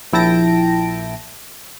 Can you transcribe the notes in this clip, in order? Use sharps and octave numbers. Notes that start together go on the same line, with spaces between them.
A#1 E4 G5 A5 A#6 D7